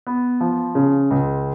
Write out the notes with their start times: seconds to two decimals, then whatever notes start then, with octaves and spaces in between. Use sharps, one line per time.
0.07 B3
0.41 F3
0.75 C#3
1.11 C#2